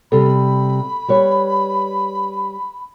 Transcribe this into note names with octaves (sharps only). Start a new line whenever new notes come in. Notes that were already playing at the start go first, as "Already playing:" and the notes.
C3 G3 A4 B5
G3 B4 C#5